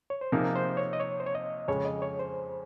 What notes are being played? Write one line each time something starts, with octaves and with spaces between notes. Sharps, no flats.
C#5
C5
C3 F3 A#3 D#4 G#4 A#4
C5
C#5
D#5
C#5
C5
C#5
D#5
F2 C#3 G#3 C#5
D#5
C#5
C5